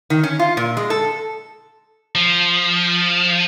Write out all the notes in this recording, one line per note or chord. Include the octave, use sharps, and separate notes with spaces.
D#3
C#4
F4
A#2
G#3
A4
F3